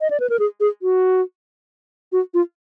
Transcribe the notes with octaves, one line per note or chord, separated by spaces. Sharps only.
D#5
D5
B4
A#4
G#4
G#4
F#4
F#4
F4